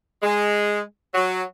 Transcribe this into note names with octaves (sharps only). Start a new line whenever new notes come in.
G#3
F#3